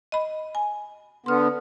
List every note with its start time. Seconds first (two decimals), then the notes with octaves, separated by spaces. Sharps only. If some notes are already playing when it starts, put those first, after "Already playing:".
0.12 D#5 B5
0.55 G#5
1.26 D3 B3 C6 F6